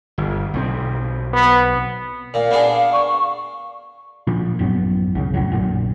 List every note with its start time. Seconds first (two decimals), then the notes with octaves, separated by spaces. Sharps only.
0.18 G1
0.54 B1 D#3 C4
1.33 B3
2.34 A#2 F5
2.51 B3 D4 G#4
2.92 C#6
4.27 A#2 F3
4.59 A1 F#2 F#3 B3
5.15 C2 C#3
5.34 A1 F2 F#3
5.52 A#1 F#2 A#2